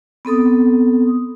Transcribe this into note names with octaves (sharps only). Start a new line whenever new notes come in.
B3 C4 A4 D#6